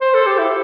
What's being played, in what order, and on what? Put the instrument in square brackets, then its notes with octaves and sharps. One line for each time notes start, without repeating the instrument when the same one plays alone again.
[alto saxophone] C5
A4
G4
E4